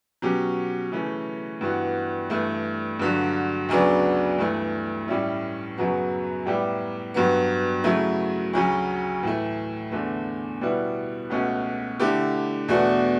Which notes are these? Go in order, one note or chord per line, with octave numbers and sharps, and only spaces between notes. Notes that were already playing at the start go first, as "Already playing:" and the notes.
B2 F#3 C#4 G4
C#3 E3 A3 C#4
G2 E3 B3 F#4
G2 E3 A3
G2 D3 F#3
D2 C#3 F#3 B3 D4
G2 E3 A3
A2 G3 C#4 E4
F#2 C#3 F#3 B3 F#4
A2 G3 B3 E4 G4
G2 F#3 B3
C#3 F#3 A3 E4
D2 C#3 F#3 C#4
A2 E3 A3
E2 D3 A3
B2 G3 B3 E4
C#2 B2 A3 C#4 F#4
D3 A3 E4 G4
E2 B2 A3 D4 F#4